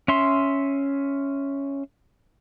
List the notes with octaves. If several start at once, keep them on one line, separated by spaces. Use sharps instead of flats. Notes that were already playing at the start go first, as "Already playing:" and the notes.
C#4 E5 C6